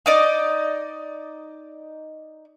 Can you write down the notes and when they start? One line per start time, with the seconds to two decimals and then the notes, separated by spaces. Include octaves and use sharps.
0.06 D#4 D5 D#5